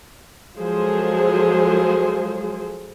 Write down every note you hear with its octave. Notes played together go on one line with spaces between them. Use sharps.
F3 F#3 G#3 G#4 A4 C5